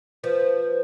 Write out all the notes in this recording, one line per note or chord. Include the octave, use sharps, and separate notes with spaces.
F3 B4